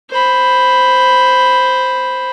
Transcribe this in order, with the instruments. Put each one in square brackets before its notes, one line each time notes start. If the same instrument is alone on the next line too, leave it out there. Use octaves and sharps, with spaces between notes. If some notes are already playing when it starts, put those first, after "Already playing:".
[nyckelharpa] C5 B5